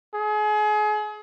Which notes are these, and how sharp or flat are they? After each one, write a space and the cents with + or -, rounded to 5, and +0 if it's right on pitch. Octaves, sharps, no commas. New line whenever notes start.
G#4 +30